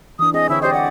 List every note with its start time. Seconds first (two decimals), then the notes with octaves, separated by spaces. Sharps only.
0.19 E3 D4 D#6
0.34 C4 G#4 D#5
0.49 D3 E4 C#5
0.62 G4 C5 D5 D#5
0.74 D5 F#5